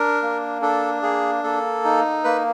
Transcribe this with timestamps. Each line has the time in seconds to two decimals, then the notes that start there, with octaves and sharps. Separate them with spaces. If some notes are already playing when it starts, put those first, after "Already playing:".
Already playing: D4 A#4
0.22 A#3
0.62 D4 A4
1.02 A#3 G#4
1.43 A#3 A4
1.84 D#4
2.24 A#3 B4